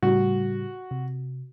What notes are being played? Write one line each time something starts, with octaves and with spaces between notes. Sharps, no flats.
A2 C#3 G3 F#4
C3